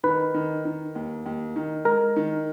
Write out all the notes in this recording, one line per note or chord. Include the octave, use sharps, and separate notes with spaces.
D#3 B4
D#3
D#3
D#2
D#2
D#3
G#3 A#4
D#3